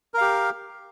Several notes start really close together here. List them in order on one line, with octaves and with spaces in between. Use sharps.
A#4 F5 G4